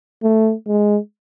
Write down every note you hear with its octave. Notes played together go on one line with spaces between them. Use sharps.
A3
G#3